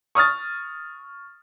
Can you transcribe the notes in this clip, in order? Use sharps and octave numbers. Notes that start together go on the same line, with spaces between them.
C#6 D#6 F6 A6